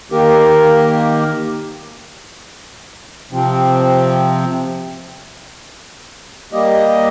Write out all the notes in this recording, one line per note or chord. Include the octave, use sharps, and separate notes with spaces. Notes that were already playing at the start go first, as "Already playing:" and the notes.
D#3 A#3 G4 A#4
C3 F3 C4
G3 A#3 G4 D#5